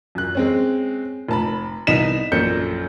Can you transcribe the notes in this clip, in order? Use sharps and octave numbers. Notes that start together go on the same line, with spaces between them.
F#2 F#6
G#3 C4 C#4
F1 A5 B5
C2 B3 D#4 B6 E7
A#1 F#2 C#4 A4 G6 C#7